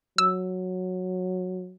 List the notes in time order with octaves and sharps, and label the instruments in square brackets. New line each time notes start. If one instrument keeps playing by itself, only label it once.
[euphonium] F#3 [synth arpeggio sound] E6